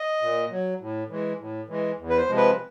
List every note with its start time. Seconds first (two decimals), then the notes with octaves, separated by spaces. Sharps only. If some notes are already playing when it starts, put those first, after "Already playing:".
Already playing: D#5
0.22 A#2
0.50 F#3
0.80 A2
1.09 E3 G#3
1.40 A2
1.68 E3 G#3
1.98 E2
2.10 B4
2.17 C5
2.28 C3 F3 G#3
2.37 B4